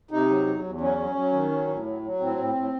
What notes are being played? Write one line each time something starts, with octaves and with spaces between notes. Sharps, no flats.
C3 D#4
F#3
E2
E2
F#3 C#4
F#3
F#3
D#3
F#3
A2
F#3
F#3
A2 C4
A2
A2